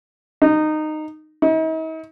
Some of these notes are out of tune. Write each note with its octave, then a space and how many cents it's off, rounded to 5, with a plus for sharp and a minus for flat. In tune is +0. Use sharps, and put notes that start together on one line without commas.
D#4 -15
D#4 +45